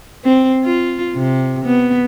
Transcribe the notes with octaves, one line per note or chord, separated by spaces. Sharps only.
C4
F4
C3
B3